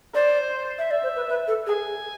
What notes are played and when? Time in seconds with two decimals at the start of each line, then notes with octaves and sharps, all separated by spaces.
0.14 C5 D5
0.78 E5
0.91 D5 E5
1.03 C5
1.16 B4
1.29 B4
1.48 A4
1.67 G#4 G#5